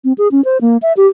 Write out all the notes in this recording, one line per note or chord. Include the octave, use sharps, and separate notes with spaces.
C4
G#4
C#4
C5
A#3
E5
G4